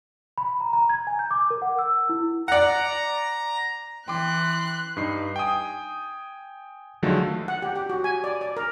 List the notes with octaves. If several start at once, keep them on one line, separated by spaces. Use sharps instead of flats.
B5
A#5
A#5
G#6
G#5
G6
D6
A#4
F#5
E6
E4
D5 F#5 A#5
E3 G5 C6 D6 F#6
G2 D#4 C7
G5 G#5 D#6
D3 D#3 F3 F#3 G#3 A3
F#5
G4
G4
F#4
G#5
D5
D5
A#4